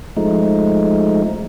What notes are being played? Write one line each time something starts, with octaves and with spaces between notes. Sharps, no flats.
F3 G#3 A3 D#4